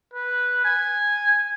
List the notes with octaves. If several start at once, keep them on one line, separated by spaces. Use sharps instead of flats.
B4
G#5